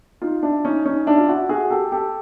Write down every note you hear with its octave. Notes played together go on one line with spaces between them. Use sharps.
D#4 F4
D4 E4
C#4 D#4
C#4 D#4
D4 E4
F4
E4 F#4
F#4 G#4
G4 A4
G4 A4